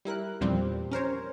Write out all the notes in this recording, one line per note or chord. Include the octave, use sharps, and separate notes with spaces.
G3 E4 A#4 F#6
E2 A#2 F3 G3 C4
C#4 A#4 C5 C#5